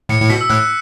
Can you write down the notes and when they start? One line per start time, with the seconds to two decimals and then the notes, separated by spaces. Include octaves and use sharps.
0.09 A2 C#7
0.21 A2
0.30 B2 B6
0.41 E6
0.50 A2 F#6